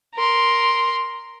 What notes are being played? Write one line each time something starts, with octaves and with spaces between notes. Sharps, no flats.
A#4 C6